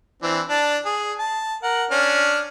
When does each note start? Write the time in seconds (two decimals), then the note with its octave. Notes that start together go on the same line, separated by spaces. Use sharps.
0.23 E3 C4 D4
0.49 D4 A5
0.86 G#4
1.19 A5
1.63 A#4 F#5
1.91 C#4 D4 F6